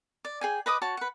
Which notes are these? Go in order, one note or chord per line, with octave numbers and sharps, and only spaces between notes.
D5
G#4 G5 G#5
B4 D#5 D6 D#6
F#4 C#5 A5
B4 F#5